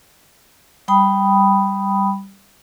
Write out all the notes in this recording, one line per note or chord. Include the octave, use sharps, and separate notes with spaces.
G3 G5 B5 D#6